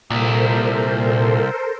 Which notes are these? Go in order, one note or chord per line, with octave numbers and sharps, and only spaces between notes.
C2 A#2 A4 A#4 C5